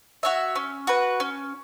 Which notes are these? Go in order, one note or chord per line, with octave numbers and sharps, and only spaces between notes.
F#4 C#5 E5
C#4
F#4 B4
C#4